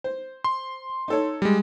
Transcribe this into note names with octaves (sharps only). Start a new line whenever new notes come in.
C5
C6
D#4 A4 C#5
G3 G#3